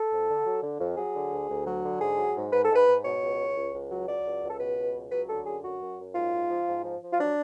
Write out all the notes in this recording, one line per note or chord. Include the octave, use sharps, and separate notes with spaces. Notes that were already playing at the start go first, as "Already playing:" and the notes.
Already playing: A4
F2
D3
F#3
D3
F2
F#3 G#4
D3
D2
D2
F#3
D3
G#2 G#4
F#3
G#2
G#2 B4
A4
G#2
B4
G#2
B2 C#5
C#2
C#2
C#2
C#2
F#3
F#3 D5
C#2
C#2
A4
B2 B4
C#2
C#2
F#3 B4
D3 A4
F#2 G#4
F#2 F#4
F#2
F#2
G#2 F4
G#2
F3
G#2
F3
F3
F4
F#3 D4